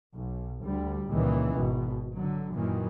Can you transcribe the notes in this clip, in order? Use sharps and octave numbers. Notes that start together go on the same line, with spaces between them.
B1
D2 G3
C#2 A#2 D#3 E3
G#1 B2
D3 F#3
F#2 A#2 D#3 E3